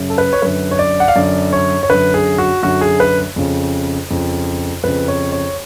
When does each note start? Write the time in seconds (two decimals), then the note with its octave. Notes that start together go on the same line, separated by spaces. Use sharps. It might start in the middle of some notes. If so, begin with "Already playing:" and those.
Already playing: F#2 C#3
0.10 A4
0.18 B4
0.33 C#5
0.42 F#2 D3 B4
0.71 C#5
0.79 D5
1.00 F#5
1.08 F5
1.16 F#2 D3 D5
1.53 C#5
1.83 C#5
1.89 F#2 D3 B4
2.14 G#4
2.38 F#4
2.63 F#2 D3 F#4
2.81 G#4
3.00 B4
3.36 F2 C#3
4.10 F2 C#3
4.84 F2 C#3 B4
5.08 C#5
5.32 C#5